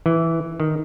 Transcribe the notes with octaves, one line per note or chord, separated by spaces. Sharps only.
E3
D#3